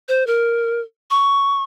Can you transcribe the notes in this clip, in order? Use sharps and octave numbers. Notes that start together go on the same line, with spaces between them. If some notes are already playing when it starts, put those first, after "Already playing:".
C5
A#4
C#6